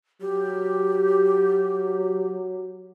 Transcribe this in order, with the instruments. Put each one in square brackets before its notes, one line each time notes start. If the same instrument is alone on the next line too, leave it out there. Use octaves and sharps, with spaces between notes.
[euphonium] F#3 [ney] G4